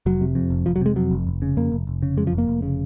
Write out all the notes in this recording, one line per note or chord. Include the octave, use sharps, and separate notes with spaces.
F1 F#3
C3
F2
F1
F1 F3
F#3
C3 G#3
F2 F#3
F1
F1
C#3
F2 A#3
F1
F1
C#3
F2 G#3
F3
F1
A#3
F1
C#3